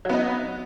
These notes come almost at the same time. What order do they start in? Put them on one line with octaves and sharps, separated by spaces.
F#3 B3 D#4